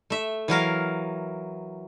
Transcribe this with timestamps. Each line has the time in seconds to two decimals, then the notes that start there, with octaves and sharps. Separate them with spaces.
0.10 A3 E5
0.48 E3 F#3 A#4 F5